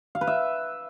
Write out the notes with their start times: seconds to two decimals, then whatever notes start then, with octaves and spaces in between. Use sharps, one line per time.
0.15 F5
0.21 B4
0.27 E5